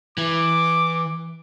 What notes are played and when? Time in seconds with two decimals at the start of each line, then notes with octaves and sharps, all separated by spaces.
0.18 E3 D6